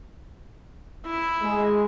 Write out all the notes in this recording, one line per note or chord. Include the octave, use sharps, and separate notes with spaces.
E4
G#3